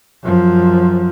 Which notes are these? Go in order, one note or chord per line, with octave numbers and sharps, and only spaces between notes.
F#2 F3